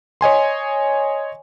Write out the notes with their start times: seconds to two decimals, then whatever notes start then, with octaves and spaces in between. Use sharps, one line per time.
0.21 C#5 D#5 G#5 C6